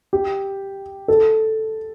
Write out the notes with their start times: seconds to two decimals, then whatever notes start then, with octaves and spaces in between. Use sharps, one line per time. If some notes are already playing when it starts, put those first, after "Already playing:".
0.13 G4
1.08 A4